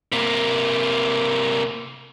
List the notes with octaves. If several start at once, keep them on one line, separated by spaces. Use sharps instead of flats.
C3 A#3